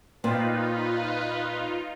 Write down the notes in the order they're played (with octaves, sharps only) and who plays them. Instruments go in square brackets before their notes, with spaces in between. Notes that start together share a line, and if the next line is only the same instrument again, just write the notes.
[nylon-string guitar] A#2 C4 [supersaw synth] D#4 F4 [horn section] B4